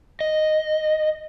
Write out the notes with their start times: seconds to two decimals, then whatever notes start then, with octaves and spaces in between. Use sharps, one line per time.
0.21 D#5